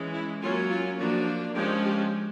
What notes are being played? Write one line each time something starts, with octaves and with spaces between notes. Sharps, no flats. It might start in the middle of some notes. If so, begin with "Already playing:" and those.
Already playing: E3 G#3 C#4
E4
F#3 A#3 C#4 F4
F4
F3 A#3 D4 F#4
F3 G#3 C#4 G4
G4